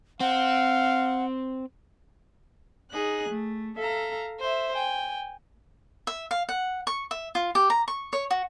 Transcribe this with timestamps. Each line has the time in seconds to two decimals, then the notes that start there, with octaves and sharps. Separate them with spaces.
0.21 C4 F5 F#5
2.91 D#4 G#4 F#6
3.29 A3
3.77 A4 E5 F5 A#5
4.40 C5 E5
4.74 G5 G#5
6.07 E5
6.31 F5
6.49 F#5
6.87 C#6
7.11 E5
7.35 F4
7.55 G4
7.70 A#5
7.88 C#6
8.13 C#5
8.31 F#4